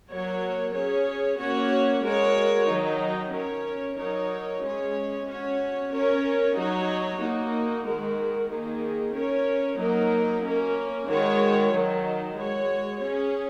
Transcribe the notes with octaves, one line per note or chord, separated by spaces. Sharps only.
F#3 A#3 F#4 A#4 C#5
C#4 G#4 C#5
A#3 C#4 F#4 C#5
G#3 F#4 A#4 C#5
D#3 F#3 D#4
C#4 A#4 C#5
F#3 D#4 A#4 C#5
G#3 C#4 G#4 C#5
C#4 F#4 C#5
C#4 A#4 C#5
F#3 D#4 F#4 C#5
A#3 D#4 F#4
D#3 G#3 F#4 A#4
D#3 A#3 D#4 G#4
C#4 A#4 C#5
F#3 A#3 D#4 A#4
A#3 C#4 A#4
D#3 G#3 F#4 C#5
D#3 F#3 D#4
G#3 F#4 C#5
C#4 G#4 C#5